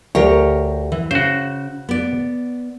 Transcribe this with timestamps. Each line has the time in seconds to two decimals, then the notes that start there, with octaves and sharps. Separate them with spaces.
0.15 D2 G4 A#4 C#5
0.92 E3
1.11 C#3 F#4 C5
1.89 B3 D5